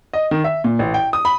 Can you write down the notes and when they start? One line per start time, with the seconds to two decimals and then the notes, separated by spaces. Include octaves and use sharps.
0.13 D#5
0.31 D#3
0.44 E5
0.64 A#2
0.79 A1
0.94 G5
1.13 D#6
1.25 B5